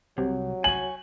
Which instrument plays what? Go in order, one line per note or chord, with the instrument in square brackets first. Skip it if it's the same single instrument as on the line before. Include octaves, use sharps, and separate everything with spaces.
[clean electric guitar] C2 [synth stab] C3 [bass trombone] F#3
[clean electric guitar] C#5 G#5 [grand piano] F#7